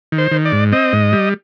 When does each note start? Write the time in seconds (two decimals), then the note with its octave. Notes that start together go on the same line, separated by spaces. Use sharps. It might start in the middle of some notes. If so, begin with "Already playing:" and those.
0.12 D#3
0.18 C5
0.31 D#3
0.45 D5
0.52 G#2
0.72 C4 D#5
0.93 G#2
1.13 G3